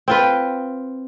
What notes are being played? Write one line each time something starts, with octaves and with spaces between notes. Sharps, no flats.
C4 F4 B4